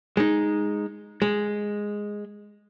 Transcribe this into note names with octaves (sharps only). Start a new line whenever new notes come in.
G#3 D#4
G#3